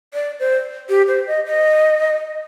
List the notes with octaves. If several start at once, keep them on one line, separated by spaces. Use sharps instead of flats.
D5
C5
G4
C5
D#5
D#5